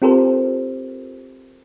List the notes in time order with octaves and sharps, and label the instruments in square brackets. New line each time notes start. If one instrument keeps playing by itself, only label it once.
[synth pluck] C4 F4 G4 A4 A#4 C5